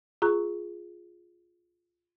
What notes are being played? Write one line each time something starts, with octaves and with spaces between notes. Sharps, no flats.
F4 G#4 A#5 C#6 F#6